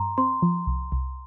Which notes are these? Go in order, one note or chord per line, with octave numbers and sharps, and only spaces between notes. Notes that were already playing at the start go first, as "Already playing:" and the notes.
Already playing: G2 A#5 C6
C4 C6
F3
C2
C2